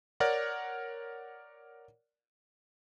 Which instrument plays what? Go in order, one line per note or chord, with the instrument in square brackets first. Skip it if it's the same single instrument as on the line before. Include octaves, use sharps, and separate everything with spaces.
[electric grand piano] A#4 C#5 D5 F#5